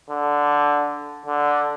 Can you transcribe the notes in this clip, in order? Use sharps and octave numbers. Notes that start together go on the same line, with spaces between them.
D3
D3